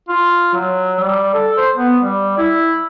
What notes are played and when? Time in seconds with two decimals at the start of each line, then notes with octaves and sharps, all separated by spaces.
0.09 F4
0.54 F#3
1.00 G3
1.34 A4
1.57 C5
1.76 B3
2.01 G3
2.38 E4